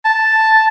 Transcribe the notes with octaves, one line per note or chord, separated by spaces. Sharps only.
A5